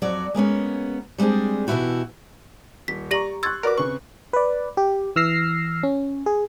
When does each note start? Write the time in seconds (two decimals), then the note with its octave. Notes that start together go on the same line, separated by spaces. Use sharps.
0.02 F2 F#3 F#4 D5
0.34 G#3 A#3 B3 C#4
1.18 G3 G#3 C4 D4 G#4
1.67 B2 E3 F3 E4 F#4 G4
2.88 D#1 B6
3.11 G4 D5 A#5 C#6 A#6 F#7
3.43 C6 C#6 E6 F#6 G#6 A6
3.63 F#4 A#4 B4 D5 D6
3.78 C#3 C4 B4 C#6
4.33 B4 D5
4.77 G4
5.16 E3 E6 F6 A#6 C7
5.83 C#4
6.26 G#4